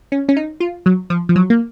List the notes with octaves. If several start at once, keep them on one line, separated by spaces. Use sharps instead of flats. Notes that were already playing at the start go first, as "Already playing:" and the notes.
C#4
C#4
D#4
F4
F#3
F3
F3
F#3
A#3